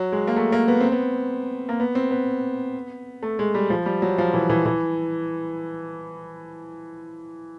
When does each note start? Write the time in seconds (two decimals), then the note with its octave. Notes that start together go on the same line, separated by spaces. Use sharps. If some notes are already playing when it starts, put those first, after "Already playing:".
Already playing: F#3
0.12 G#3
0.27 A#3
0.36 A3
0.52 A#3
0.68 B3
0.81 C4
0.92 B3
1.69 A#3
1.80 B3
1.95 C4
2.11 B3
3.23 A3
3.39 G#3
3.55 G3
3.70 F3
3.86 G3
4.02 F#3
4.18 F3
4.34 E3
4.50 E3
4.66 E3